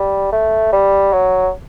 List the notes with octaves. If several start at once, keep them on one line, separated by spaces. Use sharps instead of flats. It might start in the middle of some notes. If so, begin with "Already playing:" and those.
Already playing: G3
A3
G3
F#3